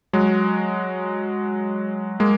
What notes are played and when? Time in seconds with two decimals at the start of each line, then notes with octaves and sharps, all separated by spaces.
0.13 F#3 G#3
2.20 G#3 A#3